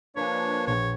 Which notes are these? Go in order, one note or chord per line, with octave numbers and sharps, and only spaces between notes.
F3 A#3 D4 B4 C#5 G#5
A#1 C#5